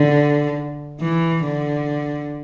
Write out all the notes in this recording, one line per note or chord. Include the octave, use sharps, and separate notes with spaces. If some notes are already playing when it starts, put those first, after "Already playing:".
Already playing: D3
E3
D3